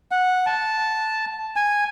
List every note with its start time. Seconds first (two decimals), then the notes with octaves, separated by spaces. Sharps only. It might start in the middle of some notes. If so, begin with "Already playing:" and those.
0.11 F#5
0.46 A5
1.56 G#5